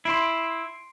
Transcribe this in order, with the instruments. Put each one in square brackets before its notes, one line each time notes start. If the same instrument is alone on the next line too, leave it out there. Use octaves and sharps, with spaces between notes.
[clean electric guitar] E4 [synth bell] C6 C7 D7